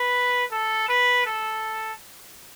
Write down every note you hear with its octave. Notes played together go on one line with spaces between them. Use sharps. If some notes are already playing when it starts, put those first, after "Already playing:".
Already playing: B4
A4
B4
A4